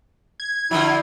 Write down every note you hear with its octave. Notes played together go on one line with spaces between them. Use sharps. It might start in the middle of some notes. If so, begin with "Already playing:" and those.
G#6
D3 F3 F#3 E4